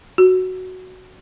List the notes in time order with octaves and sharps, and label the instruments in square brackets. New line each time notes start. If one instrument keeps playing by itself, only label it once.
[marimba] F#4